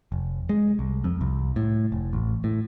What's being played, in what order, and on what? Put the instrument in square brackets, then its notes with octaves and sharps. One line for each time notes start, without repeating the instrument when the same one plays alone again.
[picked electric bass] F1
G#3
C2
F2
C2
A2
F1
A1
A2